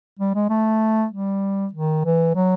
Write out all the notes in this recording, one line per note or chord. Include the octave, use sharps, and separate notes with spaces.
G3
G#3
A3
G3
D#3
E3
F#3